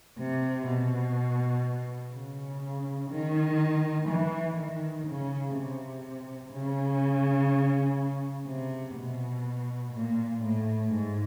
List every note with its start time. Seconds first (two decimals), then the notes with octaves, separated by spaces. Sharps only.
0.19 C3
0.67 B2
2.13 C#3
3.11 D#3
4.09 E3
4.57 D#3
5.07 C#3
5.55 C3
6.53 C#3
8.47 C3
8.97 B2
9.94 A#2
10.43 A2
10.92 G#2